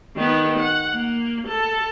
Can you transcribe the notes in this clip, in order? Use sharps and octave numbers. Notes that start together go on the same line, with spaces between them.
D#3 B3
F#5
A#3
A4